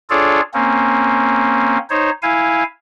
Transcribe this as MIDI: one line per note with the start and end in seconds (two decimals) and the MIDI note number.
0.10 0.41 62
0.10 0.41 65
0.10 0.41 68
0.10 0.41 69
0.10 0.41 73
0.10 0.41 74
0.54 1.78 58
0.54 1.78 60
0.54 1.78 61
1.90 2.10 63
1.90 2.10 72
1.90 2.10 73
2.22 2.63 64
2.22 2.63 77
2.22 2.63 80